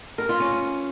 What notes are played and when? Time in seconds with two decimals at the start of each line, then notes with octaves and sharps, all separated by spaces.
0.18 A#4
0.29 F4
0.40 C#4